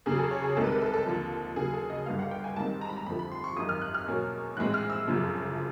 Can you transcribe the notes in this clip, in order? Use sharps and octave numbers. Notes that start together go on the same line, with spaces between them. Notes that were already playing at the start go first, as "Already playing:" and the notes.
E2 C#3 F#3 G#4
A4
C#5
G#4
C2 C3 D#3 G#3 A4
B4
A#4
A4
A4
D#2 D3 F3
D#2 C#3 F#3 G#4
A4
D#5
G1 G2 D3 G3 B3 F5
F#5
G5
G#5
G#2 D#3 G3 C4 A5
A#5
B5
A#5
F2 D3 F3 A3 B5
B5
C6
C#6
G#1 F#2 D#3 D#6
F6
F#6
F6
E2 B2 F#3 A#3 C#4
A#1 A2 E3 G#3 C4 F#6
F6
E6
G1 F#2 C#3 F3